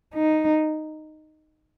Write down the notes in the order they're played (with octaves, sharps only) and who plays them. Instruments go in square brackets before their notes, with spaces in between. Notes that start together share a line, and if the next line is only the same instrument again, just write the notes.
[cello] D#4